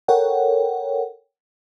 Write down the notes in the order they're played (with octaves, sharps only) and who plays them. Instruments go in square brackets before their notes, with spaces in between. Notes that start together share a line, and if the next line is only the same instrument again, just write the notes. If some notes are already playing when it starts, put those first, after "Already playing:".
[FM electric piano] A4 A#4 C#5 F#5 G5